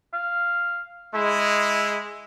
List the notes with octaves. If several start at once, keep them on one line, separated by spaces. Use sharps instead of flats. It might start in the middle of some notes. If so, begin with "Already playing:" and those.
F5
G#3 E4